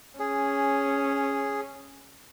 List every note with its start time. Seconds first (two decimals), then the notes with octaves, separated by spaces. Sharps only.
0.20 C#4 G#4